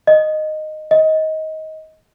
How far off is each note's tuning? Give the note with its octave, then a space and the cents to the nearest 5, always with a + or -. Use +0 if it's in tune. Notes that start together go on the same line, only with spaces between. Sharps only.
D#5 -10
D#5 +20